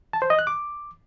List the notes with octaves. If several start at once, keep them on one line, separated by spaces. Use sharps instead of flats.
A5
C5
D#5
F#6
D6